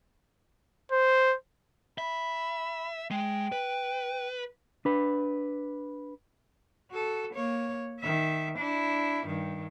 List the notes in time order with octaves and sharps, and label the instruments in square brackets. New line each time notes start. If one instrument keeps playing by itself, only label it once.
[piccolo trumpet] C5
[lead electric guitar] E5 [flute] B5
[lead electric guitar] G#3 [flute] G5
[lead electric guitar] B4
[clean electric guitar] D4 B4
[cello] F#4 A4
A#3 C#5
D#3 E5
D4 E4
G2 D#3